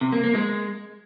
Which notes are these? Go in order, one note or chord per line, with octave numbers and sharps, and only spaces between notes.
C3
A#3
A#3
G#3